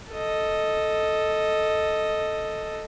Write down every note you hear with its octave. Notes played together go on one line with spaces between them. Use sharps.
A4 D#5